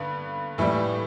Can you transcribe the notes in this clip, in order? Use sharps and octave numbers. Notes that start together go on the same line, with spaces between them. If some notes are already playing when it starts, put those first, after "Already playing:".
Already playing: G2 D3 B3
A2 E3 G3